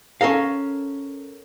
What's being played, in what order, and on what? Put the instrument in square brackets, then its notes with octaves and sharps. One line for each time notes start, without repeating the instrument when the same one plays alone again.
[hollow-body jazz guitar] C#4 A4 A#4 F5